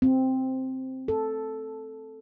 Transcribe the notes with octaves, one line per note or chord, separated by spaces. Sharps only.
C4
A4